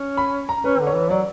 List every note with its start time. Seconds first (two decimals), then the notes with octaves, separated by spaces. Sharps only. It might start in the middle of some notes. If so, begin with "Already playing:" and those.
Already playing: C#4
0.17 B5
0.49 A#5
0.64 C#4 B4
0.80 D3
0.87 C#5
0.95 E3
1.10 F#3 D5